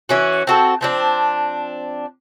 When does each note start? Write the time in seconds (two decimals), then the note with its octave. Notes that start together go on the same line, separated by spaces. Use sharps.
0.09 E3 C#4 F#4
0.47 C4 F#4 A4
0.81 F3 C4 D4